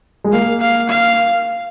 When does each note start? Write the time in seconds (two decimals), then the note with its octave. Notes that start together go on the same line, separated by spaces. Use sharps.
0.24 G#3
0.33 A#3 F5
0.61 F5
0.90 F5